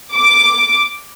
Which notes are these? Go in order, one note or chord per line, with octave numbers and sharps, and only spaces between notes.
D6